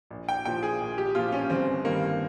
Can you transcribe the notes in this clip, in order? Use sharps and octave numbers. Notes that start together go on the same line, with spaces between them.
A#1
G5
A#2 F3 G5
G#4
A#1
G4
A#2 F3 F4
C#4
G1 C4
G2 D#3 A#3